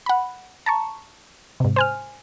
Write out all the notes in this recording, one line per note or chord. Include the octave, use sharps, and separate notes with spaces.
F#5 B5
A5 A#5 C#6
G#2 C3
C5 G#5 F6